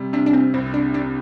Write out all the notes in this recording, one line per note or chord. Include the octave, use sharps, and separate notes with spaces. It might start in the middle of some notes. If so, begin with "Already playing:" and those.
Already playing: C3 G3
C3 D4
D4
C4
C2 C4
D4
C3 D4